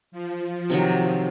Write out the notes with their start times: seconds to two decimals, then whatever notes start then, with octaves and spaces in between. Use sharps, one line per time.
0.12 F3
0.70 C3 D#3 F#3